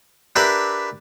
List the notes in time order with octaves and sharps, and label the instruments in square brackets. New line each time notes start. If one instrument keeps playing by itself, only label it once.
[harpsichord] D4 G4 A#4 B4 E5 B5